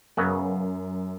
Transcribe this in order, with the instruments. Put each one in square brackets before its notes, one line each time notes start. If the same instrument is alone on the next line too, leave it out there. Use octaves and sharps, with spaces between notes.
[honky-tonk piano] F#2 [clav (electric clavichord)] C#3 F#3 B3 F#4 B4